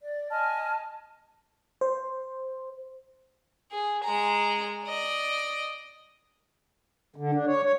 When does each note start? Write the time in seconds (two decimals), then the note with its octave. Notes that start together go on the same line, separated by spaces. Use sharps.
0.02 D5
0.30 D#5 G#5 A5 F6
1.81 C5
3.71 G#4
4.04 G#3 A#5
4.85 D5 D#5
7.16 D3
7.34 D4
7.47 C#5
7.63 C#5